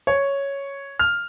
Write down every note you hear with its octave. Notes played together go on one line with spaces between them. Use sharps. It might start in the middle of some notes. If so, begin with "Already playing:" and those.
C#5
F6